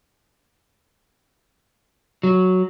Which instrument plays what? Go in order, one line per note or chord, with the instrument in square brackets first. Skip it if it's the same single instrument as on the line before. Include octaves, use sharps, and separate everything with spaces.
[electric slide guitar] F#3